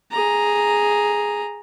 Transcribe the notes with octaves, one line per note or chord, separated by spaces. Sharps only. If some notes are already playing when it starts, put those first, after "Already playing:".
G#4 A#5